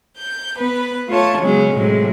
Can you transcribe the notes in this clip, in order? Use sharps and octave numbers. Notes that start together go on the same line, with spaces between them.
G6
B3 B4
A3 F4 C#5 A5
C#3 F#3 G#3 B3 C#4
A2 C3 F#3 G#3